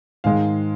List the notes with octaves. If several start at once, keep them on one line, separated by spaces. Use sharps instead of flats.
G#2 D#3 G#3 F5